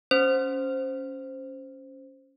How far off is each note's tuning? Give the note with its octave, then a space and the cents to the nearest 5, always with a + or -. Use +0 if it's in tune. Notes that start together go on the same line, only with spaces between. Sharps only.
C#4 +0 C5 +0